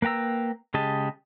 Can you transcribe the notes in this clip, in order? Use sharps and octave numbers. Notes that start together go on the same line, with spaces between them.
A#3 B4 G5 A#5 E6
C#3 G#3 G4 D#5 A5